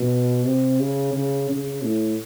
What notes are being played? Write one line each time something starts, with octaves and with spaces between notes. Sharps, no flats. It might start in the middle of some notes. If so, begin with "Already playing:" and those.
Already playing: B2
C3
C#3
C#3
C#3
A2